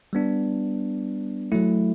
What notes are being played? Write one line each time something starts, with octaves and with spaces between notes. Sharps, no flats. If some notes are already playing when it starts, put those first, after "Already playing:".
G3 B3 D4
F#3 A3 E4